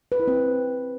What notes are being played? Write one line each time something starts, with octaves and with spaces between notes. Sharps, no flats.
B4
E4
C4